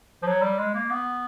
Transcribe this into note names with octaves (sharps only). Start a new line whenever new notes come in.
F3
F#3
G3
G#3
A#3
B3